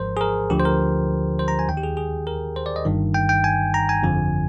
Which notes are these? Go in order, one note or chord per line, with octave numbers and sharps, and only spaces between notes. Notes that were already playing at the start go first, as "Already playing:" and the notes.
Already playing: G#1 G#2 F3 A#4 C5
G#4
A#4
D2 D3 F3 G4
C5
A#4
C5
A#5
G#5
D#2 D#3 G5
G4
G#4
G#4
A#4
C5
D5
D#5
G1 G2 D#3
G5
G5
G#5
A#5
G#5
G1 F2 D3 F3